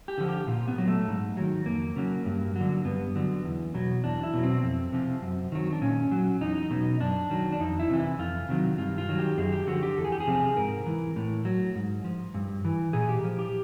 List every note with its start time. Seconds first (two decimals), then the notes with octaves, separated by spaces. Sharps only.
0.08 G4
0.18 D3 F3
0.28 G4
0.47 A#2 F4
0.68 B3
0.78 F#3
0.88 A3
1.07 G#2
1.37 D#3 F#3
1.66 F2 A#3
1.96 C#3 F#3
2.26 G2
2.56 D3 F#3
2.85 G2 B3
3.15 D3 F#3
3.45 E2
3.74 B2 F#3
4.04 E2 D4
4.23 E4
4.34 B2 F#3
4.43 C4
4.63 F2
4.93 C3 F3
5.23 F#2
5.52 D#3 F#3
5.73 D4
5.81 A#2 C#4
6.11 F#3
6.41 E2 D#4
6.71 B2 F#3
7.00 F#2 D4
7.30 D#3 F#3
7.52 D4
7.60 F2 D#4
7.80 E4
7.90 C3 E3
8.00 E4
8.19 F2 F4
8.49 C3 D#3 F#3
8.78 G2 F4
8.98 F4
9.09 D#3 F#3
9.19 G4
9.38 F#2 G#4
9.52 G4
9.67 D3 F3 F#4
9.83 G4
9.97 E2 A4
10.04 G#4
10.12 G4
10.20 G#4
10.27 C3 F3
10.57 G#2 A#4
10.86 E3
11.16 A2
11.45 F#3
11.76 G#2
12.04 F3
12.34 G2
12.65 E3
12.93 A#2 G#4
13.09 G4
13.24 F3
13.39 G4